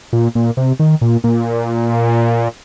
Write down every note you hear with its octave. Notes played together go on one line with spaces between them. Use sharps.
A#2
A#2
C3
D#3
A#2
A#2